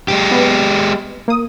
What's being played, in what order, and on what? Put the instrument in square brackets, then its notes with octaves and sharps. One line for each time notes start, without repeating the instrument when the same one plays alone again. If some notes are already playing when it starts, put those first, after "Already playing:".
[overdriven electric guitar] G#3 G4
[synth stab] B3
A#3 D#6